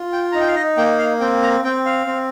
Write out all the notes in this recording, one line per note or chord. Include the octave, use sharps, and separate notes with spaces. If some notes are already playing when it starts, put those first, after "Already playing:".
Already playing: F4
G5
D#4 A#5
G5
F5
D#5
A#3 G5
F5
C4 G5
A#5
C4 G5
F5
C4